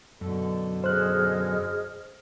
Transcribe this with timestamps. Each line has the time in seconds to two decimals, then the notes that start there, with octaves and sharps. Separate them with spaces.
0.21 F#2 B2 D3 A4
0.84 G#4 C5 D#5 F6 F#6